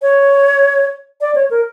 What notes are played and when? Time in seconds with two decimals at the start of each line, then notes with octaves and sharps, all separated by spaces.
0.02 C#5
1.21 D5
1.35 C#5
1.51 A#4